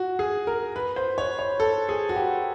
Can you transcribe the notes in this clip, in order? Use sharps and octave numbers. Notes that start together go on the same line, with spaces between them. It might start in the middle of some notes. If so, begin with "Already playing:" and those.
Already playing: F#4
G#4
A#4
B4
C5
C#5
C#5
A4
G#4
F#4
G4